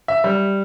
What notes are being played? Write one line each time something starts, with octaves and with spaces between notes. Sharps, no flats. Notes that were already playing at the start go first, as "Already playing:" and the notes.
E5
G3